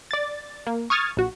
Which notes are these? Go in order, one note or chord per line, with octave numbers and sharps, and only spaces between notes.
D5 A6
A#3
C#6 D#6 F6 G#6 A6
A#1 F#4